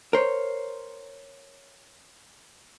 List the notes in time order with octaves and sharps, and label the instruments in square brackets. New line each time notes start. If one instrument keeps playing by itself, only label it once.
[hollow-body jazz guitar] A#4 C5 C#5